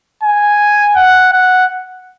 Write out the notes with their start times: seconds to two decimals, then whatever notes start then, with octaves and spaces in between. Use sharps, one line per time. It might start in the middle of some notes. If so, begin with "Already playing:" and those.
0.23 G#5
0.96 F#5
1.33 F#5